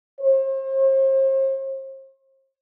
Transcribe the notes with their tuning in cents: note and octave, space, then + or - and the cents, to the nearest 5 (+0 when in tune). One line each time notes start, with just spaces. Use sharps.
C5 +40